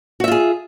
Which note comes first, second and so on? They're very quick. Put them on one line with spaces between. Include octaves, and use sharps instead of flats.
F#4 E5 F4 G#4